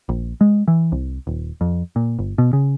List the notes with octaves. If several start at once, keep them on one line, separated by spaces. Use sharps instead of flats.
A#1
G#3
E3
C2
D#1
F2
A#2
G1
B2
C#3